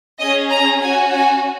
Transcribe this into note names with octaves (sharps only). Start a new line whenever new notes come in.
C#4 G#4 D#5
A#5
C#4 F#4 G#5
G#5